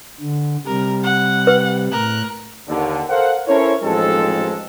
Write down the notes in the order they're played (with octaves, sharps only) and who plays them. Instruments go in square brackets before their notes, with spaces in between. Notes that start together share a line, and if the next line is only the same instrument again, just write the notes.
[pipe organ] D3
[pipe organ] C3 G3 [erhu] A#4
[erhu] F#5
[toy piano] B4
[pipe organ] A2 F#6 [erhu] A#4
[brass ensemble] D#2 D3
A4 A#4 C5 F5 F#5
C#4 E4 A4 A#4 C5 C#5
A1 D#2 F3 G#3 C4 A4